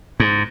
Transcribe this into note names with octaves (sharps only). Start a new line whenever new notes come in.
G#2